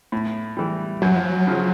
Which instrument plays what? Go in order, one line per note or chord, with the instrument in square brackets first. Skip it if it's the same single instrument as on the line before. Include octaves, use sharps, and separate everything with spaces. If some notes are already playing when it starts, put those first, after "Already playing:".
[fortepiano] A2
E3 G3
[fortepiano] F#2 [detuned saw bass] F#3
[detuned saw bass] F3
F#3
[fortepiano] C#3 F3